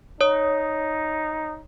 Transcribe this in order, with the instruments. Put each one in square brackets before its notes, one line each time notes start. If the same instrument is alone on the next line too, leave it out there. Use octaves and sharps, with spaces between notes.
[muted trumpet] D#4 [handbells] C#5 D#6